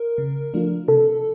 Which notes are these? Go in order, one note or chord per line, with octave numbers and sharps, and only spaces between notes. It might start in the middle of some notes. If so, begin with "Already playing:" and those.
Already playing: A#4
C#3
F3 A3 D4 F4
C3 A4